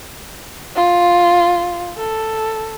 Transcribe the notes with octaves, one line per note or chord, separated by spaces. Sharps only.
F4
A4